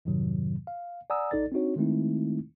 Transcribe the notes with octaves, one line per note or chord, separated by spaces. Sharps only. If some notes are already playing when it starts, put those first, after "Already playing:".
F2 G#2 C3 D#3 F#3
F5
D5 F#5 G#5 A#5 D#6 E6
A#1 D#4 A4 D5 A6
C4 D4 D#4 F#4 C#5
D#3 G#3 A3 C4 D#4 E4